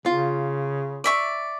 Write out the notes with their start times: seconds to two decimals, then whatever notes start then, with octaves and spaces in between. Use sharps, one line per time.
0.06 C#3 F4
1.04 D5 E5 C#6